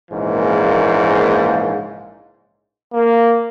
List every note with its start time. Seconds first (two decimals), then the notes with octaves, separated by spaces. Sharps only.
0.11 A#1 G#2 C#3 E3 A#3
2.93 A#3